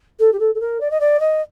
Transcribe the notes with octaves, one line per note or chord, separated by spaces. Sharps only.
A4
G4
A4
A4
A#4
D5
D#5
D5
D#5